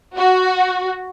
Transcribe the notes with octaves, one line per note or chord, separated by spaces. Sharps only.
F#4